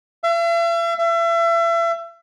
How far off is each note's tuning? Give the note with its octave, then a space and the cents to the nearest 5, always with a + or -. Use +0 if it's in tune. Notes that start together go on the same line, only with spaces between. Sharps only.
E5 +45
E5 +35